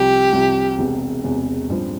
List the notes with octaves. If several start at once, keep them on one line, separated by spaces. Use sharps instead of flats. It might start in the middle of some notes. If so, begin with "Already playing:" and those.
Already playing: C2 C3 F3 G4
C2 C3 F3
E1 E2 C3
E1 E2 C3
A1 G2 F3 C4